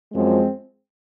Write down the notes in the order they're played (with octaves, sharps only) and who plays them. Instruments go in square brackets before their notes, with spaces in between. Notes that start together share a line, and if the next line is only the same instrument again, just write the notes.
[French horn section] F#2 F3 G#3 C4